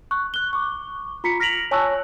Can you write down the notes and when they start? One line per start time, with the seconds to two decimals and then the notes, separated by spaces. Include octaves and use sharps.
0.11 C#6 F#6
0.34 F#6 G7
0.53 C#6 D6
1.24 F4 A#5 B6 C#7
1.40 F6 A#6 B6 D7 F7 F#7
1.71 C#5 G#5 A5 C#6 E6 F#6